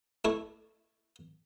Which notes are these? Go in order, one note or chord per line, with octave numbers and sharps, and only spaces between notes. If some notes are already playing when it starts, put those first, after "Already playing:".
A3 E4